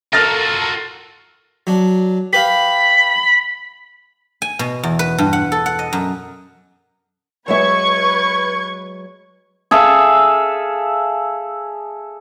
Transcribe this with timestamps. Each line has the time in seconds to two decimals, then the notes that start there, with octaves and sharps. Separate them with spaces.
0.13 F4 F#4 A4 A#4 F6 A6 A#6
1.67 F#3 D4
2.33 G4 B4 F5 B5
4.42 G#5
4.59 B2
4.83 E2
4.99 B4
5.18 G2
5.33 F#5
5.52 A4
5.66 F#5
5.79 D#5
5.93 F#2
7.48 F#3 G#3 B4 E5 C#6 G#6
9.71 G#4 A4 E5 F5